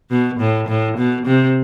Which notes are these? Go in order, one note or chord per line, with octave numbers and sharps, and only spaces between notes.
B2
A2
A2
B2
C3